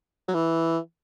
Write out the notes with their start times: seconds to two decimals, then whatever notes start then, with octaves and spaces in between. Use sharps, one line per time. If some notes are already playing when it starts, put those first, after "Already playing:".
0.28 F#3
0.34 E3